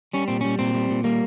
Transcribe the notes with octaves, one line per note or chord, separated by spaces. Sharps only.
G3 C#4
A#2 C4
G3 C#4
A#2 C4
G3
A#2
G3 A#3